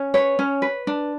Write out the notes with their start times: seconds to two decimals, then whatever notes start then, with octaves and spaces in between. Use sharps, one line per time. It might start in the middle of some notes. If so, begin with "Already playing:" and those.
Already playing: C#4
0.14 B4 C#5
0.39 C#4
0.62 B4
0.87 D4